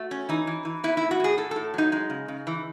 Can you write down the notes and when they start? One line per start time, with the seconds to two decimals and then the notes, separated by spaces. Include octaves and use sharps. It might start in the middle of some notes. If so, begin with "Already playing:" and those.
Already playing: A3 F#4
0.11 C#4
0.29 E3 D#4
0.47 E3
0.65 E3
0.84 B3 E4
0.97 A2 E4
1.11 F#4
1.20 A2 G#4
1.38 A2 A4
1.51 A2 A4
1.74 F#3 D#4
1.92 G#3 D#4
2.10 C#3
2.28 C#3
2.47 E3